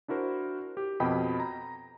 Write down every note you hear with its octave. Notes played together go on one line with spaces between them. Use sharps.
D4 E4 F#4 A#4 C5
G4
F2 B2 D#5 G5 B5
A#5